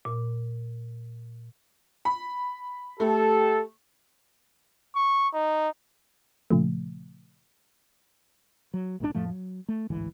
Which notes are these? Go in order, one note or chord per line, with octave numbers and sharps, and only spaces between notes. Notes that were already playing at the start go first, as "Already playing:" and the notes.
A#2
B5
A3 G4 A4
C#6
D#4
A#2 C#3 F3 A3
F#3
A#1 G#2 B2 D4
F2 A2 F3 A3
F#3
A3
A1 D2 G#2 E3